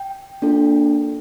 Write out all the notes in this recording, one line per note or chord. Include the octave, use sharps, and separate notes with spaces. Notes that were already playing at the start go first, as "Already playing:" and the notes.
Already playing: G5
A#3 D4 F4 A4